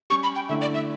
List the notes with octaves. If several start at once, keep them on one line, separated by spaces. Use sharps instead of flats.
G3 C#4 G4 C#6
B5
G5
D3 A3 E4 E5
D5
E5